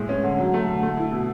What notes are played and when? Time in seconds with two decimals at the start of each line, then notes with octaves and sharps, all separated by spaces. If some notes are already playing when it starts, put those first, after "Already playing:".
Already playing: A2 G#3
0.09 C#4
0.24 D3
0.39 F#3
0.54 A3
0.68 D3
0.83 A3
0.97 E4
1.11 B2